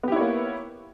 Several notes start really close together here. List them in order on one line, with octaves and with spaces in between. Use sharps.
B3 G4 E4 C#5 A#3